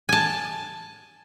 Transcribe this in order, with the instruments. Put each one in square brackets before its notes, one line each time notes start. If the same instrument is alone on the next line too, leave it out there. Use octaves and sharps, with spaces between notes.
[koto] G#5 A5